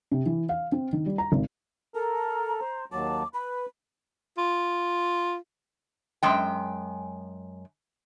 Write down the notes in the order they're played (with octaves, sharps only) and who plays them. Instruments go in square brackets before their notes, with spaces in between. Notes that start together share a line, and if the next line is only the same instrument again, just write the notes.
[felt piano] C3
E3
F5
C4
D#3
G3
A#5
G#1
[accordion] A4 A#4 [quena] A#5
[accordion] C5
[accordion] D#2 F#3 A5 [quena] D6
[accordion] B4 [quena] B5
[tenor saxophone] F4
[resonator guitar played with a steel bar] F#2 G#3 G5